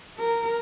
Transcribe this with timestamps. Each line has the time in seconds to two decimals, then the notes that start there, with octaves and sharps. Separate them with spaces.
0.19 A#4